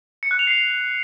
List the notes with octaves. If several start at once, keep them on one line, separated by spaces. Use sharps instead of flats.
C#7
F#6
F7
C7